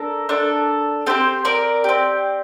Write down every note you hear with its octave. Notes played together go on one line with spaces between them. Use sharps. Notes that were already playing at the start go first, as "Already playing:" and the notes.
Already playing: D4 A4 A#4
D4 A4
C4 G4 A4 C5
A#4 D5
C4 G4